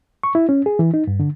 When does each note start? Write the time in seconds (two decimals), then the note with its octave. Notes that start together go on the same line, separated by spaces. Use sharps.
0.23 C#6
0.35 E4
0.49 C#4
0.66 G#4
0.79 E3
0.94 D#4
1.07 G2
1.20 D3